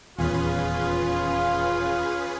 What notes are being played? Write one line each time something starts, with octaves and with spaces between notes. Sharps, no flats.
D#1 E2 C#4 F4 G#4 B4